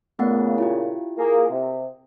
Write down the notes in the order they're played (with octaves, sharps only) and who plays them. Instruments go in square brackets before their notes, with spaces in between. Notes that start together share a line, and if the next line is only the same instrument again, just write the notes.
[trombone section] A#2 C#3 [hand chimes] A3 B3 F#5
[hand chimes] E4 F4 G4
[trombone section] A#3 G#4
C3